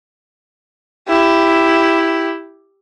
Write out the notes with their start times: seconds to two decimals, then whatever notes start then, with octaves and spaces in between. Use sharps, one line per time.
1.08 E4 G4